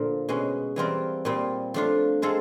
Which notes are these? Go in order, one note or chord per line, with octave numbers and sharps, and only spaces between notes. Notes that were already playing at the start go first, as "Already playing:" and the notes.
Already playing: A#2 D3 F3 A#3
B2 G#3 C#4
E3 G3 C4 F4 A#4
A#2 G3 C4 F4
F3 A3 D4 F4
G#3 C4 F4 A4